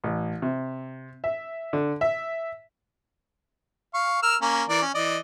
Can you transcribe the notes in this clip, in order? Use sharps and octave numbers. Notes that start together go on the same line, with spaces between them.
A1
C3
E5
D3
E5
F5 C#6
A#4 E6 F6
A#3 C#4 A#4
E3 A#4 D5
C#4
E3 D5 D#5